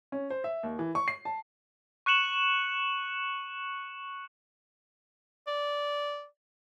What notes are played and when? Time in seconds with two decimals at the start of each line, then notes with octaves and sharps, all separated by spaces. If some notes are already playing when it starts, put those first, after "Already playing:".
0.12 C#4
0.30 C5
0.44 E5
0.63 D#2
0.79 E3
0.95 C#6
1.08 C7
1.25 A5
2.06 C#6 F#6 C#7 E7 F#7
5.47 D5